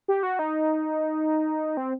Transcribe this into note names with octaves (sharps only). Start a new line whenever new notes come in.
G4
F#4
D#4
C4